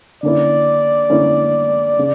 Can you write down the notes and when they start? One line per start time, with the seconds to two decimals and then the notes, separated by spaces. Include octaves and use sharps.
0.23 D3 A#3 C#4 E4 D5
1.10 D3 A#3 C#4 E4
1.99 C#3